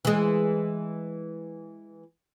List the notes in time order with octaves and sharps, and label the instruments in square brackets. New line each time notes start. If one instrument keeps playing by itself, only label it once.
[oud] E3 G#3